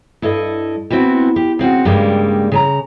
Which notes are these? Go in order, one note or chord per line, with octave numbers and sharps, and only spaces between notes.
G2 E4 A4 D#5
B3 C4 E4 F#4 G4
G4
C#3 C4 F#4 F#5
G2 C#3 G3 G#3 A#3
C#3 G#5 A#5